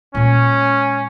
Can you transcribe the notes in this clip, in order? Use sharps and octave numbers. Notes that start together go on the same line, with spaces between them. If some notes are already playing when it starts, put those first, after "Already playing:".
A#2 G#3 C#4